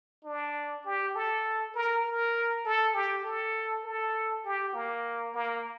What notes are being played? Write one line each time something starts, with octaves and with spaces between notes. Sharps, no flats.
D4
G4
A4
A#4
A#4
A4
G4
A4
A4
G4
A#3
A#3